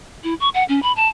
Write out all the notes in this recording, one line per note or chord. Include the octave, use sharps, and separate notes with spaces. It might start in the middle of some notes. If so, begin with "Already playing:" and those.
E4
C#6
F#5
C#4
B5
A5